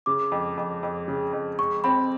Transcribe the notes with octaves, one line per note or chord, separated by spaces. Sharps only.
C#3 D6
F2
F2
F2
C#3
F2
G#3 C#6
C4 B5